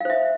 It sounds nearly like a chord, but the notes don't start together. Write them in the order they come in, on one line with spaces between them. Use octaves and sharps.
F5 C5 E5